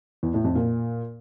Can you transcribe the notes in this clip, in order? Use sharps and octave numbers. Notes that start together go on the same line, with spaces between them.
E2
A2
F2
A#2